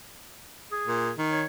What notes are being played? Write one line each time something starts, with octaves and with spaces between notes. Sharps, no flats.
G#4
A#2
D#3
C#5